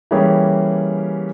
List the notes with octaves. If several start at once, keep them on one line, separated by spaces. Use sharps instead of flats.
E3 G3 A#3 C#4 G4 G#4